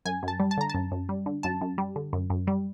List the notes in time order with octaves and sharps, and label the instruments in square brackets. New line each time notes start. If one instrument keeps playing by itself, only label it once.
[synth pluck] F#2 G#5
F#2
A5
G3
A5
D3 A#5
F#2 A5
F#2
G3
D3
F#2 A5
F#2
G3
D3
F#2
F#2
G3